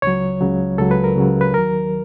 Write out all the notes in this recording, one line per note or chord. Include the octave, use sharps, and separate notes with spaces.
C#2 C#3 F#3 C#5
C#2 C#3 F#3
C#2 C#3 F#3 A4
B4
A#4
C#2 C#3 F#3
B4
D#2 D#3 F#3 A#4